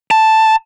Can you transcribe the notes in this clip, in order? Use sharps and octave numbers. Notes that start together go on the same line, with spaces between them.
A5